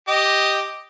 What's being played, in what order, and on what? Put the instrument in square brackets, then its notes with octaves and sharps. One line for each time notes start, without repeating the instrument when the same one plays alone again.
[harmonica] G4 D#5